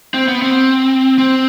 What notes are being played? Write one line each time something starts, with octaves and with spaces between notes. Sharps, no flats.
C4
B3
C4
C4